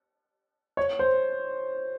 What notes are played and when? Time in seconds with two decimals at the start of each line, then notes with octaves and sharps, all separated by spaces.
0.77 C#5
0.99 C5